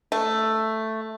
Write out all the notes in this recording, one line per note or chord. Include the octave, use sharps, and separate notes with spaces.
A3